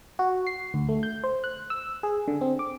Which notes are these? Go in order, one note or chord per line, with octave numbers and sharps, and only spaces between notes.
F#4
C7
D2
A3
G6
C5
F#6
E6
G#4
D3
C4
D6